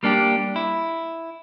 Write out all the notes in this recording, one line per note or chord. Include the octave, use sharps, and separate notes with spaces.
G3 A#3 D4 F#4 G4
E4